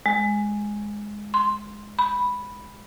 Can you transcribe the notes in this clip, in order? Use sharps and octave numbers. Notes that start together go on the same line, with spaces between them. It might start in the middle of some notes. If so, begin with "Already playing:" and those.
G#3
C6
B5